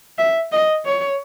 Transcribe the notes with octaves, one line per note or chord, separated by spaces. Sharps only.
E5
D#5
C#5